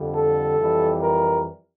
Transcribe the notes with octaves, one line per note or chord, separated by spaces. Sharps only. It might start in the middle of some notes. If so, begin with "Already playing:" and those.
Already playing: F2 D3 G3
A4
F2 E3 G3
A#4